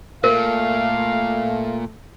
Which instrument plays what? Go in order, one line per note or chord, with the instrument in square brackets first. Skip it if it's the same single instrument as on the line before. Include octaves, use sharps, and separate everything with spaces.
[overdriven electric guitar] A#2 [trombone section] A3 [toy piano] A#4 [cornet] F5